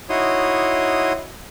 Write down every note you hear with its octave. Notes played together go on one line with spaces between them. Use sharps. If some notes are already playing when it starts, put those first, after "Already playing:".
D#4 E4 F#4 C#5 C6 D#6